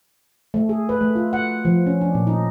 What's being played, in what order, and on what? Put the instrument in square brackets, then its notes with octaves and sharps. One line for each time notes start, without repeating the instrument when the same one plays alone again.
[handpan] A3
G#4
B4
A3
F4
F#5
F3
C#4
D4
A#2
D#4